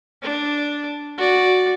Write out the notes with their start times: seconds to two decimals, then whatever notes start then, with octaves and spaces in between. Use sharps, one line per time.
0.22 D4
1.18 F#4 D5